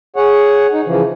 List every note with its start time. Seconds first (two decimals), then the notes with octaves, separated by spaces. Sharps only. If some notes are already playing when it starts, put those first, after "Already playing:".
0.16 G#4 C#5 F#5
0.73 D#4
0.85 C#3 E3 F3